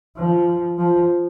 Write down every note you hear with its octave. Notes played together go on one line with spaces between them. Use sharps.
F3
F3